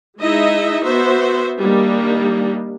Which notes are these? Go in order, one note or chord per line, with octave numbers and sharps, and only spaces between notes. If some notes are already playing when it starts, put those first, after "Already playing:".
G#3 D#4 E4 D#5 E5
B3 F#4 C5 E5
D#3 G3 A#3 D4 D#4